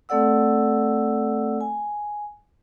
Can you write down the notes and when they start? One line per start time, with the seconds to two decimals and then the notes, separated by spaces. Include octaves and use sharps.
0.09 A3 C4 A4 D5 F#5 E6
1.61 G#5